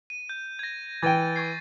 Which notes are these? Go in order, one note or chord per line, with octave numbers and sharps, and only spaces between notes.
D#7
G6
G#6 A#6
E3 G5 G#6 A6 D#7
C#6 G#6 C7